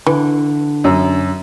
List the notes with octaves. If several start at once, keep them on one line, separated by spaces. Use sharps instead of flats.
D3 E3
F#2